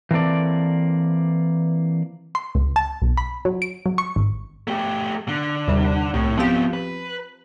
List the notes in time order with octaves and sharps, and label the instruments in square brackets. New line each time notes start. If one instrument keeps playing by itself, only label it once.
[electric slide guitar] E3 A#3 C4 A4 D5
[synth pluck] C6
C#2
A5
B1
B5
F#3
D7
F#3
C#6
G#1
[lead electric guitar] A3 G4
D3
[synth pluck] D#2 C3 G3
[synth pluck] C2 [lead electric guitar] A2
[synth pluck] F3 C4 G4 [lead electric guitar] B3 F4
[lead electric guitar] B4